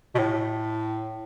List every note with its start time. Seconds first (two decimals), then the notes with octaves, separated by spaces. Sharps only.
0.15 B2
0.19 A2